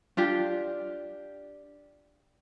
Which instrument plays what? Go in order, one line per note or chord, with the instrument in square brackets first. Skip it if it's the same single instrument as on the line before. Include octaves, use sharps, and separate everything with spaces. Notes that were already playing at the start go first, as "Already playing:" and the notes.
[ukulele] D4 F4 G4